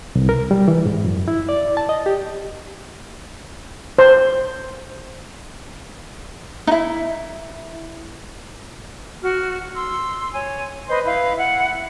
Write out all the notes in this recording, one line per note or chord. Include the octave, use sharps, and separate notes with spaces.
C2
A#4
G3
E3
G#2
F#2
E4
D5
A5
D#5
G4
C5
D#4 E4
F#4 F6
C6 E6
C#5 G#5
B4 C5 D#5 C6
E4 B4 F5
E4 F#5